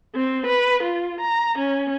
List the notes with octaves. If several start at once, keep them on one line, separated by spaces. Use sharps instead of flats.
C4
B4
F4
A#5
C#4